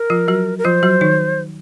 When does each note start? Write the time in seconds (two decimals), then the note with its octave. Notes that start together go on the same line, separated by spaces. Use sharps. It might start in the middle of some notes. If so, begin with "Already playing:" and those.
Already playing: A#4
0.10 F3 F4
0.28 F#3 F#4
0.59 A#4
0.65 F3 F4 C5
0.83 F#3 F#4
1.01 D#3 D#4